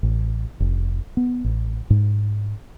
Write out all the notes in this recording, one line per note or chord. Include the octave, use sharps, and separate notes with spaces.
A1
F1
B3
A1
G#2